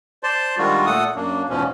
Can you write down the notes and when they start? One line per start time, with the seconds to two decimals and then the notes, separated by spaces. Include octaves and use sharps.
0.23 C5 D5 A5 C6
0.58 D#3 G3 G#3 D4 F4 F#4
0.86 A#2 A3 A4 F#5 D#6
1.15 F#2 F#3 A#3 D4
1.49 E2 G#2 B2 F3 C#4